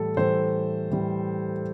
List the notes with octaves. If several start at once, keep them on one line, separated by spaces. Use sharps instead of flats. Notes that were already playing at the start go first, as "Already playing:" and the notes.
Already playing: A2 E3 G3 A4
A2 E3 G3 C5
A2 E3 G3